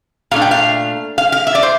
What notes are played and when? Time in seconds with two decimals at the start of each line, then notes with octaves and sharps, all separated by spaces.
0.31 A#2 A3 D4 F5
0.42 G5
0.51 F5
1.18 F5
1.32 F5
1.47 E5
1.55 D5
1.63 C5